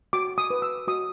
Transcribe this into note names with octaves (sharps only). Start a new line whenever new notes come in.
F#4 D6
D#6
B4
E6
F#4 D#6